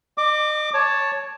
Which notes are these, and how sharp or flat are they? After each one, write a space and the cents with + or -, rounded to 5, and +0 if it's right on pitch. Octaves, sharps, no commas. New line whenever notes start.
D#5 -35 D6 +10
C#5 +0 A5 +0